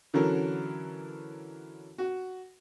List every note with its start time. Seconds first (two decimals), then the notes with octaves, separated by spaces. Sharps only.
0.14 D3 E3 F#3 C#4 A4 A#4
1.98 F#4